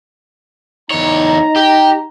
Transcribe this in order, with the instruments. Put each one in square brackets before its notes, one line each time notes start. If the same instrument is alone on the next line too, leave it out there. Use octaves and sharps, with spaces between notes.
[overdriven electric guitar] E2 C#5 [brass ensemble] D#4 A#5
[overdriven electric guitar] G4